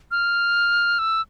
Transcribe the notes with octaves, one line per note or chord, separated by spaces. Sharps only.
F6
E6